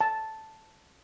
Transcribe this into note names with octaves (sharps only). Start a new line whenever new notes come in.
A5